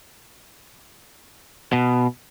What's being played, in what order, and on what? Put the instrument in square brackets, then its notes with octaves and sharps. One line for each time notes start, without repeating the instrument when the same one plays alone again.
[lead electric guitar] B2